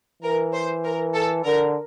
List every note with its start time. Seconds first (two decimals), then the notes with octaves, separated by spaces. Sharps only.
0.22 E3 A#4
0.53 C5
0.84 A#4
1.14 A4
1.44 D3 A#4